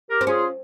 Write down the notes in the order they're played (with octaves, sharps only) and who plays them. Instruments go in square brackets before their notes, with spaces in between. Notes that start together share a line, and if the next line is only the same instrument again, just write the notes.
[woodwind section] G4 A#4
[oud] C4
[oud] C#4 [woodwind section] F4 G#4